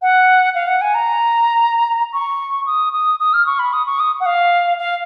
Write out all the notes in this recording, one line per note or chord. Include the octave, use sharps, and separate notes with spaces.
F#5
F5
F#5
G#5
A#5
C#6
D#6
D#6
D#6
F6
C#6
B5
D#6
C#6
D#6
F#5
F5
F5